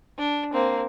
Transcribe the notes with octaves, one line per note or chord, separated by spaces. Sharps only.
D4
A#3 C4